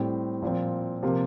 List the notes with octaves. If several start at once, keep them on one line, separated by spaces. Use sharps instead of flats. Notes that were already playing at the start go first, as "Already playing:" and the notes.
Already playing: A2 G3 C4
A#2 F3 C4
C3 F3 A#3 F4